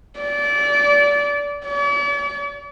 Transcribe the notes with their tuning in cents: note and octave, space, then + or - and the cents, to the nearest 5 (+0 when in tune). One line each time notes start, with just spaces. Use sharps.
D5 -25
D5 -45